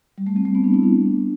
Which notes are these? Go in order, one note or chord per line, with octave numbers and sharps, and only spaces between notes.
G3
A3
C4
A3
B3
D4
E4
D4